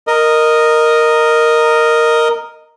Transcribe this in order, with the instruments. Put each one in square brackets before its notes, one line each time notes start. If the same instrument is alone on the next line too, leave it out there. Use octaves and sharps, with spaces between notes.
[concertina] A#4 D#5